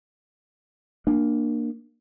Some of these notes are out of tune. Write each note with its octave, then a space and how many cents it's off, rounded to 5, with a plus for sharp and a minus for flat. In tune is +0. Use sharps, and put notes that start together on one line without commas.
A#3 +0 D4 +20